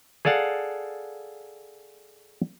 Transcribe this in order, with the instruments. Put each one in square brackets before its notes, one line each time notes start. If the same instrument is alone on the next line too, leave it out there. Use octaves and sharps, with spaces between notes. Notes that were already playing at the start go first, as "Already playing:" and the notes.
[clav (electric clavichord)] G#4 A4 D5 F5 F#5